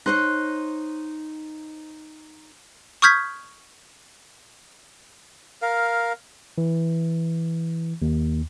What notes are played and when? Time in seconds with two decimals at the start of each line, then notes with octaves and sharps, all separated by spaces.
0.06 D#4 C5 C#5 C6 F#6 A#6
3.02 C#6 D#6 F6 G6 G#6 B6
5.62 A#4 F5
6.58 E3
8.02 D#2